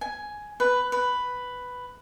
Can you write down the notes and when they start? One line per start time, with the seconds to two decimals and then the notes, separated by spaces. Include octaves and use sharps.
0.01 G#5
0.60 B4
0.92 B4